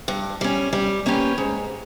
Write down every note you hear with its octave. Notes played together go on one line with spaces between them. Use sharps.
G2
G3 C#4
G3
A#3 C#4 G4 B4
G#2